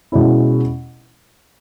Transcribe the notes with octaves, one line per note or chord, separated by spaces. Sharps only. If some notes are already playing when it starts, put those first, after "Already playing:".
B2 G#3 C#4 E4